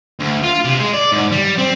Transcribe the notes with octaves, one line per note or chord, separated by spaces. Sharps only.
D2
F4
C3
G#3
D5
G#2
G3
C4